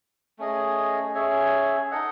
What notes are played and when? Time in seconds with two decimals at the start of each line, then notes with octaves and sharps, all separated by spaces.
0.39 A3 C#4 G#4 D#5
1.15 C#4 G#4 C#5 E5
1.91 D#4 A4 D#5 F#5